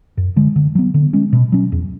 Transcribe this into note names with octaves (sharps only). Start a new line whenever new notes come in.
F#2
D3 G#3
D3
F#3 B3
D3
G#3 C#4
B2
F#3 C#4
E2